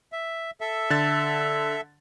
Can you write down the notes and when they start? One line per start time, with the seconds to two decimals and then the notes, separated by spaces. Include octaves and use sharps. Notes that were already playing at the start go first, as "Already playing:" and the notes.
0.12 E5
0.61 A4 E5
0.90 D3 A6